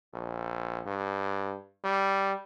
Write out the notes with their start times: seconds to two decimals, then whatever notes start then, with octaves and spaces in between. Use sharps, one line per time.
0.13 A#1
0.87 G2
1.84 G3